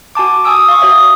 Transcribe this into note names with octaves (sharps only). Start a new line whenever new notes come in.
F#4 G#5 A5 D6
G#5 D#6 E6 D7
F5 C#6
F#4 C#5 E5 D#6